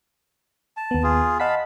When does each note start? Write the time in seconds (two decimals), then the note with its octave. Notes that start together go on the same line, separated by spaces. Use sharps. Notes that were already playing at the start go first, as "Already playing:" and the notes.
0.77 A5
0.91 D#2 B3
1.03 F4 G#4
1.40 D#5 F5 F#5 A5 B5 B6